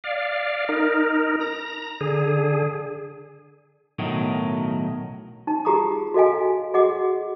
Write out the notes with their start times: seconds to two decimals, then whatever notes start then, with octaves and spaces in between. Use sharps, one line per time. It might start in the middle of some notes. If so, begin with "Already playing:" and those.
0.04 D5 F5
0.69 D#4 A#4
1.40 A#5
2.01 D3 G#4
3.99 B1 A2 D#3 F#3
5.47 D#4 A5
5.65 F4 G4 G#4 A#5 D6 D#6
6.14 F#4 A4 D#5 F5 G#5
6.74 F#4 G#4 D#5 F#5 D6